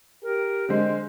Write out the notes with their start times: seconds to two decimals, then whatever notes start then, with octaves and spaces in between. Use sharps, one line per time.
0.23 G4 A#4
0.69 D3 G#3 C5